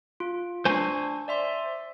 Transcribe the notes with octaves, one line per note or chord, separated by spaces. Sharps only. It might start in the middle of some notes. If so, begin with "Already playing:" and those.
F4
D4 C5 G#5 C#6
D5 E5 C6